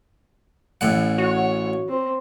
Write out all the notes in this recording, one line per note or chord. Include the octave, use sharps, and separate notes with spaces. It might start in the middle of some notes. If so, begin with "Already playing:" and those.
A1 A2 F#5
F#4 C#5
C4